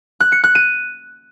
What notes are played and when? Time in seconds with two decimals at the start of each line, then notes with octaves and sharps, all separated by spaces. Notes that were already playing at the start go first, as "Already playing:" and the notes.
0.20 F#6
0.32 C#7
0.44 F#6
0.55 D#7